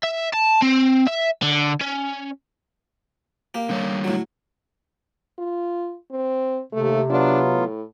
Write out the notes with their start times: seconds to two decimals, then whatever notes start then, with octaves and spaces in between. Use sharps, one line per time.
0.04 E5
0.34 A5
0.62 C4
1.07 E5
1.42 D3
1.81 C#4
3.54 A#3 G4
3.69 D3 G3 C#5
4.04 A2 F#3
5.38 F4
6.11 C4
6.73 D#2 C3 A3
7.10 F#3 B3 D4 F4
7.54 A2